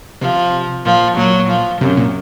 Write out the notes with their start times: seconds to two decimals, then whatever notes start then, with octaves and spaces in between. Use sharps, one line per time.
0.21 C3 F3
0.85 A#2 F3
1.17 A#2 F#3
1.49 F3
1.81 F#2 C3
1.97 A#2